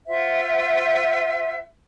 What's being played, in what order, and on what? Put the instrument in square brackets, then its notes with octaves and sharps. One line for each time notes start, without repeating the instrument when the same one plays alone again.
[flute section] F4 C5 E5 F#5